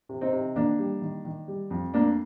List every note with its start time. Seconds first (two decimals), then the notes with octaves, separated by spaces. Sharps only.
0.09 C3
0.21 C4 D#4
0.33 C3
0.56 D#3 A#3 D4
0.79 G3
1.02 D#3
1.25 D#3
1.48 G3
1.71 F2
1.94 A3 A#3 D4